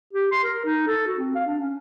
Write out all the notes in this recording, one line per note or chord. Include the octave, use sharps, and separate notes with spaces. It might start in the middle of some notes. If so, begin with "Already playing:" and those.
G4
C6
A#4
D#4
A4
F#4
C4
F5
D4
C#4